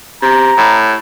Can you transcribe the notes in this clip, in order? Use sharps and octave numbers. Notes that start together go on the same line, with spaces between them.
C3 A#5
A2